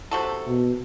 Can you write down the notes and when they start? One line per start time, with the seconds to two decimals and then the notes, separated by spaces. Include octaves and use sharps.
0.11 C3 F#4 A4
0.47 B2